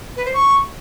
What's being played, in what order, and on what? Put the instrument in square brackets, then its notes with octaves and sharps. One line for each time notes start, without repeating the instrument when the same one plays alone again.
[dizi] B4
C5
C#6